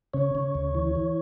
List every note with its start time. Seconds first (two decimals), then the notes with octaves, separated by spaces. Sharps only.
0.13 C#3 C#5
0.35 C#3
0.55 D2
0.75 E3
0.95 E3